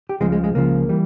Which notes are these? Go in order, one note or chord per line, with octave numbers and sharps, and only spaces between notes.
G4
C#2 C#3 F3 G#3
G#3
G#3
C#2 C#3 F3 A#3
E3 G3